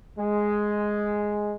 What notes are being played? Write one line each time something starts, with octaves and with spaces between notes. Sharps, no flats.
G#3